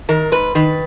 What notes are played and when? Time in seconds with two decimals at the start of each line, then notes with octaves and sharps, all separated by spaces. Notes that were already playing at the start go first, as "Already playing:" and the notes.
0.09 D#3 A#4
0.32 G#2 B4
0.55 D#3 B4